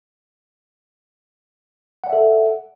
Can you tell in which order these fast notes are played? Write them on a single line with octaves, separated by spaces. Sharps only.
F#5 D5 E5 A4